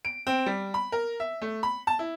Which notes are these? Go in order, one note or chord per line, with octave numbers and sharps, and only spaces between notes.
D7
C4
G3
B5
A#4
E5
A3
B5
A5
E4